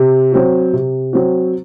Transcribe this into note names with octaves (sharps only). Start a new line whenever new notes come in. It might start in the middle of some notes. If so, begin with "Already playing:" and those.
Already playing: C3
F#3 C4 F#4
C3
F#3 C4 F#4